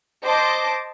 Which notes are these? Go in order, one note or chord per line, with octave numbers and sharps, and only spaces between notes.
C5 D#5 A5 D6